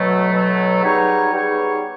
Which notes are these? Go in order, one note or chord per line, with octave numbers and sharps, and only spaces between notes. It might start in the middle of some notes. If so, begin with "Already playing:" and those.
Already playing: B2 F#3 A3
B2 F#3 A3
G3 B3 D#4 G#4 C#5
G3 B3 D#4 G#4 C#5